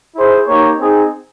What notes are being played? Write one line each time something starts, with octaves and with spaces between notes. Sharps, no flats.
E4 G#4 C5
A#3 D#4 G4 A#4 C#5
C4 D#4 G#4